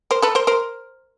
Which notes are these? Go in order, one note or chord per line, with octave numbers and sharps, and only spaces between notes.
A#4 C5
A4 B4
A#4 C5
A#4 C5